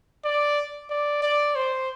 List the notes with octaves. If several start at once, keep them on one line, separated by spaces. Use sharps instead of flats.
D5
D5
D5
C5